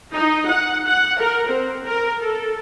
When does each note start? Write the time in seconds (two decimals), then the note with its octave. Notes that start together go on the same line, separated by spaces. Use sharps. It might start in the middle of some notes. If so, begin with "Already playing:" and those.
0.14 D#4
0.50 F#5
0.86 F#5
1.19 A#4
1.49 C4
1.85 A#4
2.21 A4